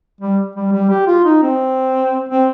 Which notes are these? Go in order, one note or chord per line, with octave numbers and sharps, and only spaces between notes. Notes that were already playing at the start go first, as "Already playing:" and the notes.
G3
G3
G3
G4
F4
D#4
C4
C4